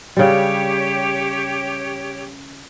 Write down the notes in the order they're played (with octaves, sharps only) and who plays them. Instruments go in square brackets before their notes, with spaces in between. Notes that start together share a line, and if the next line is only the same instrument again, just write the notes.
[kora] C#3 G3 [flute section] G4 C#5